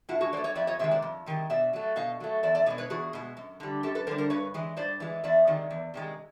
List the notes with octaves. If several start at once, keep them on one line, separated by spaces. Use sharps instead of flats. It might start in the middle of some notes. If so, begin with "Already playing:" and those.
A2 E4 F#4
F#4 G#4
F#3 A3 C5 D5
C#5 D#5
F2 D5 E5
C#5 D#5
C3 D#3 G#3 E5
C5 D5
F2
C3 D#3 G#3
B2 D5 E5
F#3 A3
B2 D#5 F5
F#3 A3
E2 D5 E5
D5 E5
B2 G#3 C#5 D#5
B4 C#5
E2 F#4 G#4
B2 G#3
F#2
D3 G3
F#2 G4 A4
A4 B4
D3 G3 A#4 C5
A#4 C5
G2 B4 C#5
E3 G#3
G2 C5 D5
E3 G#3
E2 D5 E5
C3 D#3 G#3
E2
C3 D#3 G#3